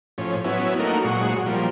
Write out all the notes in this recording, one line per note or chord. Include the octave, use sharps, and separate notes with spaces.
A2 F3 C#4
F#3 B3 C#4 E4
A3 A#3 D#4 F#4 A#4
A#2 F#3 G#3 F#5 C#6
F3 G3 A#3